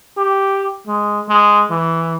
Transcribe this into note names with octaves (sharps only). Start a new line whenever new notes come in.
G4
G#3
G#3
E3